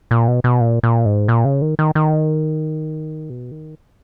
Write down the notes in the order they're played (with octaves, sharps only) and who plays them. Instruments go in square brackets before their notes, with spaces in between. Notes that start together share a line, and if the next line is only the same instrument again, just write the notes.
[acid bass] A#2
B2
B2
A#2
A#2
G#2
A#2
C#3
D#3
D#3
D#3
B2
D#3